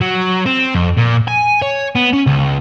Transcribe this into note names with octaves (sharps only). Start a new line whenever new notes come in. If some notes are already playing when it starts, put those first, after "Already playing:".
F#3
C4
F2
A#2
G#5
C#5
B3
C#4
C#2